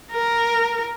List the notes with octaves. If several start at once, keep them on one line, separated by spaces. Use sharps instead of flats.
A#4